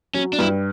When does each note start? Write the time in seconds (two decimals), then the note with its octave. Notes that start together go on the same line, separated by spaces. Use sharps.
0.15 F#3 C#4
0.33 D4
0.39 G2 E4